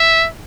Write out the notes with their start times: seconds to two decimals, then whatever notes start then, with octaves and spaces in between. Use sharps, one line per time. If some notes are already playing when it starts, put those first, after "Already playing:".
Already playing: E5